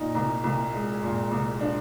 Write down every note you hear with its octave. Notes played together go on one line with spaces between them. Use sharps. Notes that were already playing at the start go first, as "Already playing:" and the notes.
Already playing: A#2 D#4
C2
C2
G#3
A#2
C2
D4